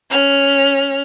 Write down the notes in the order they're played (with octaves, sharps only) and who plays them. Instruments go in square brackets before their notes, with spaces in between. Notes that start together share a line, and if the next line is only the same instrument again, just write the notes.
[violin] C#4 F6